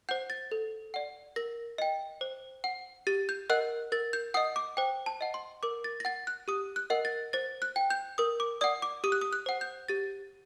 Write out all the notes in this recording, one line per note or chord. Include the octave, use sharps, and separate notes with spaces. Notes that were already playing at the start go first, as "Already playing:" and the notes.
C5 F#5 G6
A6
A4
D5 F#5
A#4 A#6
D#5 G5
C5
F#5
G4 A6
G6
A#4 D#5 F#5 F#6
A#4 A6
G6
D#5 F#5 D#6
D6
C5 G5
A5
D#5 F#5
C6
A#4 D6
A6
A#6
F#5 A6
F#6
G4 D#6
F#6
A#4 D#5 F#5
A6
C5 A6
F#6
G5
G6
A#4 D#6
D6
D5 F#5 D#6
D6
G4 D#6
F#6
D#6
F#6
C5 F#5
G6
G4 A6